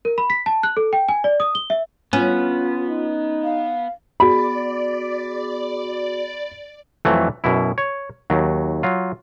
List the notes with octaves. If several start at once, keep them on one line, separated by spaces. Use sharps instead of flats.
A#4
B5
B6
A5
F#6
A4
G5
G#5
D5
D#6
G7
E5
B3 C#4 F4
D#4
F5
B3 F#4 G#4 D5 B5
F2 E3 F#3 A3
F#2 B2 E4
C#5
D#2 F#3
F#3 F4